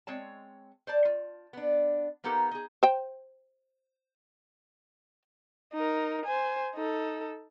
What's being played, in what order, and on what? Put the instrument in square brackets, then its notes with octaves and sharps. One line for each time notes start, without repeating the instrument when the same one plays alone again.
[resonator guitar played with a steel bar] G#3 C4 C#5 A5
C5 D5 A5
F4
B3 D4
A#3 B3 D#4 G4 A4 A#4
D#4 G#4
[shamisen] C5 G5
[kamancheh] D#4 A#4
C5 G#5
D#4 A4